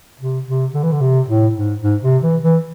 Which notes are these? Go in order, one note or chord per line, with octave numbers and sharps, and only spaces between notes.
C3
C3
D3
E3
D3
C3
A2
G#2
G#2
C3
E3
E3